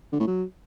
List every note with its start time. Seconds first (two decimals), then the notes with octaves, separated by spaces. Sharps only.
0.13 D3
0.20 A2
0.27 F#3